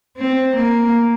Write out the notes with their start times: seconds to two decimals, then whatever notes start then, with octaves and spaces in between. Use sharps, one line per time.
0.18 C4
0.57 A#3